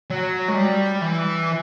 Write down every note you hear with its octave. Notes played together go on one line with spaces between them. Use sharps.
F#3
G#3
G3
E3